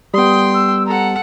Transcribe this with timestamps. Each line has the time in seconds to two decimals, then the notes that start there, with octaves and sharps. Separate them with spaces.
0.14 G3 B3 G5 C6 D#6
0.54 E6
0.86 A4 F#5 A#5